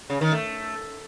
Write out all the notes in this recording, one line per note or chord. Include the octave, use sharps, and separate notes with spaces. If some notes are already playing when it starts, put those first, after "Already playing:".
C#3
D#3
A3